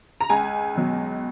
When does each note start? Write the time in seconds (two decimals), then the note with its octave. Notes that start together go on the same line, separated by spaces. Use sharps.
0.21 A#5
0.30 C#2 G#5
0.75 B2 F#3